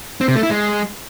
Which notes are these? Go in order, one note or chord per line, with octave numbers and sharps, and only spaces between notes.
C4
C3
A3
E4
G#3